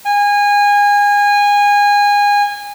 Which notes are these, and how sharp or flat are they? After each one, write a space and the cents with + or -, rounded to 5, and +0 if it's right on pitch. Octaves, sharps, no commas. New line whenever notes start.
G#5 -25